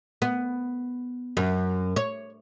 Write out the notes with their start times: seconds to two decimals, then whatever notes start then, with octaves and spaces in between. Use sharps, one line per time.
0.22 B3
1.37 F#2
1.96 C#5